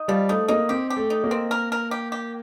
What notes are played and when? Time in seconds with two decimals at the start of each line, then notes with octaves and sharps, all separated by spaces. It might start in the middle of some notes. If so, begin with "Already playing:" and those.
Already playing: D#4
0.08 F3 G3
0.29 A3 D#4
0.48 A#3 D#4
0.69 C4 G4
0.90 G4
0.97 A3
1.10 D#4
1.24 A#3
1.31 C4
1.51 A#4
1.72 A#4
1.91 G4
2.12 G4